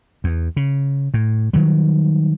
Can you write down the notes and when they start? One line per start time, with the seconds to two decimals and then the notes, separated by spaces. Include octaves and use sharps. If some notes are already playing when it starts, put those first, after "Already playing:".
0.24 E2
0.56 C#3
1.14 A2
1.53 D#3 F#3 G3